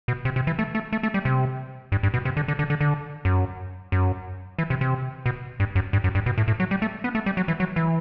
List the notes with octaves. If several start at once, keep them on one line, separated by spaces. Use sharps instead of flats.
B2
C3
C3
E3
A3
A3
A3
A3
G3
C3
G2
G2
B2
C3
D3
D3
D3
D3
D3
F#2
F#2
E3
C3
C3
B2
G2
F#2
G2
F#2
G2
B2
A2
A2
F#3
G3
A3
B3
A3
G3
F#3
E3
F#3
E3